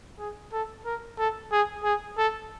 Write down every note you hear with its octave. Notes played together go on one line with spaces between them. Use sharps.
G#4
A4
A#4
A4
G#4
G#4
A4